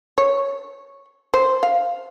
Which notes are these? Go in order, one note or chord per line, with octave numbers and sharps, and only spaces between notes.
C#5
C5
F5